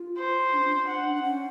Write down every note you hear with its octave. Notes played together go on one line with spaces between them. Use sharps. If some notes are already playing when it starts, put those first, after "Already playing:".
Already playing: F4
C5
D4
C#4
D4
F#5
D4
C#4